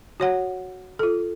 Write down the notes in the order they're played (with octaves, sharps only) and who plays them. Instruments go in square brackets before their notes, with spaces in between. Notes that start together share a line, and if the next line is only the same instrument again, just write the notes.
[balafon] F#4 C#5 F#5
F4 A4